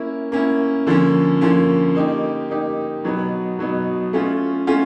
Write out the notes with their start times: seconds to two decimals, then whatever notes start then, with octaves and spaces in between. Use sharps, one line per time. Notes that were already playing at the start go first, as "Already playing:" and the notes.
Already playing: A#3 C#4 E4
0.32 A#3 C#4 E4
0.87 D3 F3 A#3 C#4
1.41 D3 F3 A#3 C#4
1.95 A#3 D#4 G4
2.50 A#3 D#4 G4
3.04 B2 F#3 B3 D#4
3.59 B2 F#3 B3 D#4
4.13 A3 C#4 F4
4.67 A3 C#4 F4